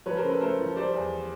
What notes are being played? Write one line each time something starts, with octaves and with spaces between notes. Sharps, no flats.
F3 B4 C#5
A#4 C5
C#3
A4 B4
A3 A#4 C5
F3
G3 C5 D5
E2